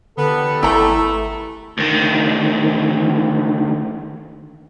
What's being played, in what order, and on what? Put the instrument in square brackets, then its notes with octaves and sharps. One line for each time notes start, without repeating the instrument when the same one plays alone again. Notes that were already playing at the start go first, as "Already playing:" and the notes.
[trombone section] E2 G4 A4 [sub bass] D3 [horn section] B3
[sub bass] G#1 [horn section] A3 [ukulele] E4 A#5
[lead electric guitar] D2 D#3